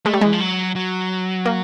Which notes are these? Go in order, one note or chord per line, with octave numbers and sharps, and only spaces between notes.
G#3 A3
G3
E3 G#3
F3
F#3
F#3
A#3